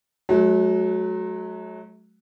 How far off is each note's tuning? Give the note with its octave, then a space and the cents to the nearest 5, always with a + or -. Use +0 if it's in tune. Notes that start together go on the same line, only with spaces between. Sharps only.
F#3 +0 A3 -40